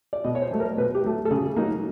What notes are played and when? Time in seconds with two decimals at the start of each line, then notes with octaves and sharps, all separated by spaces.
0.13 D5
0.24 B2 D#5
0.35 C#5
0.42 C5
0.51 F#3 A3
0.60 A#4
0.77 B2 B4
0.95 G4
1.04 F#3 A3
1.25 A4
1.31 C#3 G#4
1.56 F#3 A#3 D#4